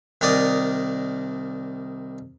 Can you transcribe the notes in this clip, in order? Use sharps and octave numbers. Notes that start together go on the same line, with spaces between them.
C2 D#3 A#4 D5 D#6